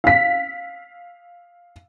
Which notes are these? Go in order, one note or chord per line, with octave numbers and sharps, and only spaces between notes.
F5 B6